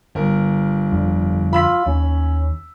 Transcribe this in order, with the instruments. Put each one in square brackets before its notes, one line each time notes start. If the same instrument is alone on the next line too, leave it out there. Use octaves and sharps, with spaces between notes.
[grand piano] G1 A#4
[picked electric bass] F2 D3
[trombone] F4 [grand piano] B5 E6 B6
[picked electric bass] D#2 [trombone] C#4